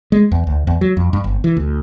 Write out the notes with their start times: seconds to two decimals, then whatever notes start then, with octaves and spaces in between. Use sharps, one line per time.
0.12 G#3
0.31 E2
0.47 D2
0.67 E2
0.81 F#3
0.97 F2
1.13 G2
1.24 G1
1.44 E3
1.57 D2